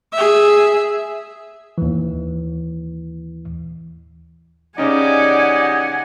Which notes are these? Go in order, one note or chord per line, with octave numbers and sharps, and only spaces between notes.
G#4 E5
D#2 E3
C#3 C#4 D#4 G4 D5 D#5 F#5 G#5